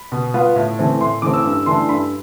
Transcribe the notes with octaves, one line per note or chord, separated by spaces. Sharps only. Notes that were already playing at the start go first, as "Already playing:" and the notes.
Already playing: B5
B2
B3 F4
A2
E3 A3 C4
A2 C6
E3 A3 C4 D6
E6
G2
E3 A3 D4 C6
G2 B5